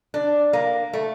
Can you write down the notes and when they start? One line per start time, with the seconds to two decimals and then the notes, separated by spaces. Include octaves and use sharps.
0.14 D4
0.53 A#3
0.93 A3